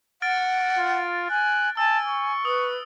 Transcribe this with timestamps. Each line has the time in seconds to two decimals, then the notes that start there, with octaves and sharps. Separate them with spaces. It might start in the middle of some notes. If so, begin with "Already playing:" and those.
0.22 F#5 F6 A6 D7
0.79 F4
1.30 G#5 F#6
1.77 G#5 A5 E6
2.06 C#6
2.45 B4 D#6